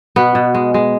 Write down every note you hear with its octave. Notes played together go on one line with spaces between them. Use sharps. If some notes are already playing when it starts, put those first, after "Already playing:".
B2 B3
B2
G#3
G#3